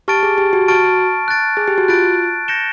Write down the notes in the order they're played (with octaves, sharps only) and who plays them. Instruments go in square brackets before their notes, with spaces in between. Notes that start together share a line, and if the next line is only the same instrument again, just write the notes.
[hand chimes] G4 [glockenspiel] A5 C#6 F6 A6 D7
[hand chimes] G#4
G4
F#4
[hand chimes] F#4 [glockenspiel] A5 C#6 F6 A6 D7
[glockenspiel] F#6 A6 D7
[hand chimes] G#4
G4
F#4
[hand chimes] F4 [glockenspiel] F#6 A6 D7
[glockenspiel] G6 A#6 C#7 E7 G7